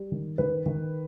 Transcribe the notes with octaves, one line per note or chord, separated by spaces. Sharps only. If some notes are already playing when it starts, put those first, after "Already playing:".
Already playing: G3
D#3
D#3 B4
D#3